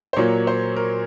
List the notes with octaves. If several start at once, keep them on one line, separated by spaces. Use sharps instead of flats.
C5
A#2 F#3 A#3 C#5
C5
A#4